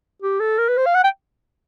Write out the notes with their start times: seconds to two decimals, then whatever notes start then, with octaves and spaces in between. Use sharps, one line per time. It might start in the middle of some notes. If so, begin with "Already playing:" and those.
0.22 G4
0.40 A4
0.59 A#4
0.68 B4
0.77 C5
0.86 F5
0.94 F#5
1.04 G5